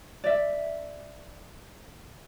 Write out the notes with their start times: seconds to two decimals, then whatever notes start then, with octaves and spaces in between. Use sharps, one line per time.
0.24 D5 E5